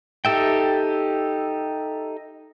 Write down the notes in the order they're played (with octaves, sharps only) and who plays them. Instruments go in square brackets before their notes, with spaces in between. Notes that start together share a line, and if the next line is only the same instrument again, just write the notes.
[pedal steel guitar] D#4 G4 A4 E5 G5